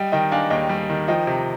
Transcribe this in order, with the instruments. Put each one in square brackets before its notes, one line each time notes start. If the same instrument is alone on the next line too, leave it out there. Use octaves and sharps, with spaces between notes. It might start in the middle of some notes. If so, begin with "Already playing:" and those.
Already playing: [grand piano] G3 [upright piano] D#5 G5
[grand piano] D#3 [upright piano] D#5 G5
[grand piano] D4 [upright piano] F5 G#5
[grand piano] D#2 [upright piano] D#5 G5
[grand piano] G3
D#3
[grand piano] F3 [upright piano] D#5 G5
[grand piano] C3